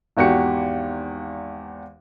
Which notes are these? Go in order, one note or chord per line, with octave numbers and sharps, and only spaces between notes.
G#1 E2 F#4 G4 C#7